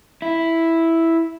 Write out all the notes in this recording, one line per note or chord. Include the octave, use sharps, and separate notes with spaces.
E4